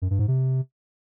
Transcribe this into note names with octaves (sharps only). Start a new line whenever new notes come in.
F#2
G2
G#2
C3